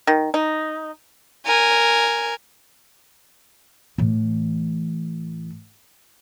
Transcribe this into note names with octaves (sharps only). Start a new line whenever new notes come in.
D#3
D#4
A#4 G#5
A2 E3